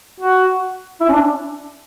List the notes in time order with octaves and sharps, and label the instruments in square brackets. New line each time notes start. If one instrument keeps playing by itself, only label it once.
[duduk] F#4
E4
C#4
D4